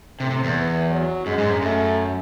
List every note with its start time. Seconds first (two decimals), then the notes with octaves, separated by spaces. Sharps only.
0.20 A2 C3
0.31 C3
0.44 E2
0.55 E3
0.90 F#3
1.26 F#2 G#3
1.38 G#2
1.50 F#2
1.62 F#2 A3